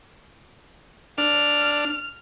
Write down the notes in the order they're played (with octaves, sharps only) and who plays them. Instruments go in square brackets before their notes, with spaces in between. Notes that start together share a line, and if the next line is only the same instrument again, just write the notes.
[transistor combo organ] D4 [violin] F6